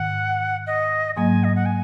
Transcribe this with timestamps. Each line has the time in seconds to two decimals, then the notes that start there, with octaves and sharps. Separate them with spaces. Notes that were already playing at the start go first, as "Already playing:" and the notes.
Already playing: G#2 D#3 F#5
0.67 D#5
1.16 G#2 F#3 A#3 G#5
1.44 D#5
1.56 F#5
1.66 G#5